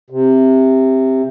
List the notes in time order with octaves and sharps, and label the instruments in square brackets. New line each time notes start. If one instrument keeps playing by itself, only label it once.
[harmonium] C3